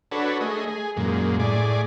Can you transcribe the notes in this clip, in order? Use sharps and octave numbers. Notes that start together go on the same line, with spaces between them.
D4 F#4 A4 B4 C#5
A3 G#4 D#5
G#4
F#2 A#2 G#3
A2 G#4 D5